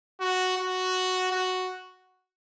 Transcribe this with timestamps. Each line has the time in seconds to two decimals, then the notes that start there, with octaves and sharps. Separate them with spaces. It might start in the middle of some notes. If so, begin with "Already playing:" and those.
0.20 F#4
0.57 F#4
1.31 F#4